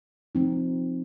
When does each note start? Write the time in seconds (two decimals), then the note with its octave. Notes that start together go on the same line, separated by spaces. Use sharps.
0.35 F3 C4 D#4